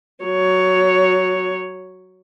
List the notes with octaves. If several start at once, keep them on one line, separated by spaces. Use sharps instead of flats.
F#3 C#5